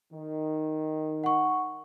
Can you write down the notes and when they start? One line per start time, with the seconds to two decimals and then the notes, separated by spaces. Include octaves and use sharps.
0.12 D#3
1.24 F#5 C#6